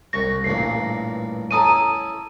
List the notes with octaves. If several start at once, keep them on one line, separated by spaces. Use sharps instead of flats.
C2 C#6 A#6
A1 G2 A#2 C7
C#4 E4 A4 A#5 D#6 D#7